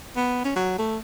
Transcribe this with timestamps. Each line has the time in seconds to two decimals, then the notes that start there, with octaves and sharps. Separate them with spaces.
0.16 B3
0.45 C#4
0.56 F#3
0.78 A3